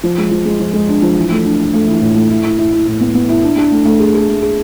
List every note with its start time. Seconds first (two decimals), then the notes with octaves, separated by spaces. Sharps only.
0.04 F3
0.18 G#3
0.31 F3
0.45 G#3
0.60 F3
0.73 G#3
0.88 D4
1.02 F3
1.17 E3
1.31 A3
1.45 D4
1.59 D4
1.73 A3
1.87 E3
2.01 A2
2.16 A3
2.30 E4
2.44 E4
2.58 E4
2.72 E4
2.87 A2
3.01 B3
3.14 B3
3.29 E4
3.43 D4
3.57 D4
3.71 A3
3.85 A3
4.00 G#4
4.14 G#4
4.29 A3
4.42 G#4